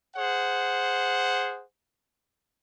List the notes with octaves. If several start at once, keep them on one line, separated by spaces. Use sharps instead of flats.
G#4 C5 F#5